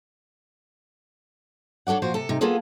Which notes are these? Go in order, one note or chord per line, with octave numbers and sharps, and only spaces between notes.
C#4 D4 A4 D5 F#5
A#2 F3 F#4 C5
C3 A4
C3 D#4
A#3 B3 F4 G#4 A4